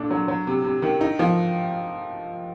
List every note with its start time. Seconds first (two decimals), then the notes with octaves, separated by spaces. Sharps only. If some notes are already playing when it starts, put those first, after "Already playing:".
Already playing: A#2 A3 D4
0.11 F#3
0.28 F#3
0.47 C3
0.64 C3
0.82 D#3
1.01 D#4
1.19 F3